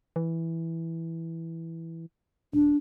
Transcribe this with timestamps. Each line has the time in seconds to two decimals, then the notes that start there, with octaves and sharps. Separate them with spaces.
0.16 E3
2.53 D#1 D4